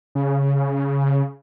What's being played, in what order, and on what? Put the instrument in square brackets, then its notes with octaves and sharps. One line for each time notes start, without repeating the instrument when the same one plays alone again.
[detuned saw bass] C#3